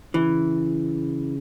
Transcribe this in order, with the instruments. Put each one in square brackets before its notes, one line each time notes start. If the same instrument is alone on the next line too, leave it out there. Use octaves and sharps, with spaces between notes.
[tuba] C#3 [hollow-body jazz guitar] E3